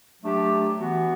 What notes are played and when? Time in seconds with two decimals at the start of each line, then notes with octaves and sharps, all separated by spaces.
0.22 F#3 A3 D4 G4
0.79 E3 B3 F#4